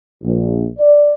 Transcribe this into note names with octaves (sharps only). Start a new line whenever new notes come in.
A#1
D5